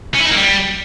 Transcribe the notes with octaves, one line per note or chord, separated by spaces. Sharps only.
C#4
E4
D#4
A#3
G3